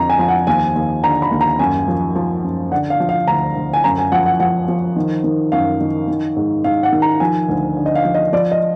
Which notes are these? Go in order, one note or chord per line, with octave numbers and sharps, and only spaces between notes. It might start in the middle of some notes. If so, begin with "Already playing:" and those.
Already playing: F2 D3 F3 A#5
G#5
F3
F#5
D#2 G#5
D#2
D3 A#5
B5
D#2
A#5
F#2 G#5
F3
F3
F#2
D3 F#5
F5
F3
F5
D2 A#5
D2
G#5
F#2 A#5
G#5
F3 F#5
F#5
F3 F#5
F3
D#3
D#3
F#2 F5
D#3
D#3
G#2
G#2 F5
F#5
D#3
A#5
F3 G#5
D2
D3
D#5
F5
F3
D#5
F3 D5
D#5